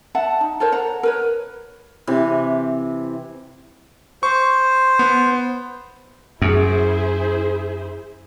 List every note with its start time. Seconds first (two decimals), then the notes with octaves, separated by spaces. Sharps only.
0.15 E5 F#5 A5
0.41 D#4
0.60 A4 A#4 C5 C#5
0.72 F#5 A#5
1.03 A#4 B4 C#5
2.07 C3 E3
4.23 C5 C#6
4.99 B3
6.42 F#2 E4 G#4 C5